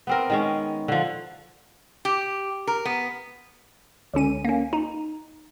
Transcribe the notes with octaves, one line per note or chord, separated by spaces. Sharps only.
B3 C4 A#4
D#3 G#3 C#4
D3 F3
G4
A#4
B3
C#2 D3 C#4 D#7
A#3 C#4
D#4